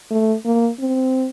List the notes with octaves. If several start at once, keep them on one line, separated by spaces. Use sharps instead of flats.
A3
A#3
C4